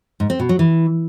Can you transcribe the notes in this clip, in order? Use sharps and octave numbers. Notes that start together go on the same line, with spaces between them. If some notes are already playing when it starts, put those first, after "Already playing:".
G#2
C4
B2
F#3
E3